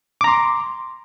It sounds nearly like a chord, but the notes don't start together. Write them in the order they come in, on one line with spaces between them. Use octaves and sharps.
D6 A#5 C6